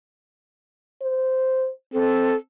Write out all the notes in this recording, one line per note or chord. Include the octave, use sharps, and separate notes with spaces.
C5
C4 A4